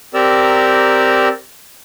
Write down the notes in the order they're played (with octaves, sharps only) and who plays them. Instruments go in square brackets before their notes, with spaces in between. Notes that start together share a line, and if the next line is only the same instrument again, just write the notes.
[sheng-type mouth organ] C4 G4 A#4 D5 A#5 E6